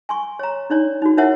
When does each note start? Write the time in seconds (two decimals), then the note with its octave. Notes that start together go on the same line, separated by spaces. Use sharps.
0.09 G#5 C6 C#6
0.39 C#5 A#5
0.70 D4 D#4 C#5 D5
1.02 D#4 F#4
1.17 D#4 E4 A#4 C#5 E5 F#5